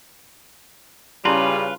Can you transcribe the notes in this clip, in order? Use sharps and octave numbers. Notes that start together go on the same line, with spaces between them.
C#3 G3 E4 F4 B4 A5 C6